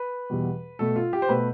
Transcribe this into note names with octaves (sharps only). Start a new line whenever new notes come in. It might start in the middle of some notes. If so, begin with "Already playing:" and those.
Already playing: B4
E2 B2 G3
B2 A3 A4
F4
G4
C5
B2 A3 B4